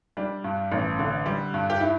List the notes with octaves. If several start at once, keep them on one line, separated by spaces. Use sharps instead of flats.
G3 D4
G2
A1
D3
G3
G2
G4
E4